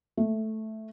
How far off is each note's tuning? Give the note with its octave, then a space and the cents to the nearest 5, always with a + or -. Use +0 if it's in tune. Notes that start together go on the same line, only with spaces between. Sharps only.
A3 -5